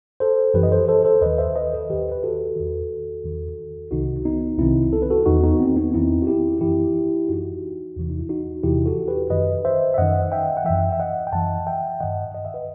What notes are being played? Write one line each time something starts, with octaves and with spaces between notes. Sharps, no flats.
A4 C5
F#2 E3 G4 B4
D#5
A4 C5
A4 C5
A4 C5
D#2 D#3 B4 D#5
C5 E5
B4 D#5
A4 C5
D#2 D#3 G4 B4
B4
F#4 A4
E2 D#3
E2 D#3
C2 C3 D#3 D#4 F#4
B3 D#4
C2 C3 D#3 C4 E4
A4
B4
F#4 A4
E2 D#3 D#4 F#4
B3 D#4
C4
B3 D#4
E2 D#3 C4 E4
F#4
E4 G4
F#2 E3 E4 G4
F#2 E3 D#4 F#4
E2 C3 E3
D#4
E4
D#4 F#4
E2 C3 E3 E4 G4
F#4 A4
G4 B4
F#2 D#3 B4 D#5
C5 E5
E5
F#2 D#3 D#5 F#5
E5 G5
F#5
F#2 E3 E5 G5
E5
D#5 F#5
G5
F#2 E3 F#5 A5
E5 G5
G2 D#3 D#5 F#5
D#5
E5
B4 D#5